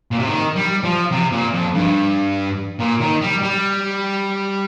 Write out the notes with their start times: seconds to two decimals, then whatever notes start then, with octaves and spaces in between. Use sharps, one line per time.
0.11 A#2
0.19 C3
0.27 D#3
0.56 G3
0.84 F3
1.12 C3
1.33 A#2
1.53 F2
1.74 G2
2.79 A#2
3.00 D#3
3.21 G3
3.42 G3